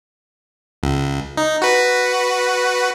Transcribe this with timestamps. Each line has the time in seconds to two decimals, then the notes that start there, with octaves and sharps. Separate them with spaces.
0.83 C#2
1.38 D#4
1.62 F#4 B4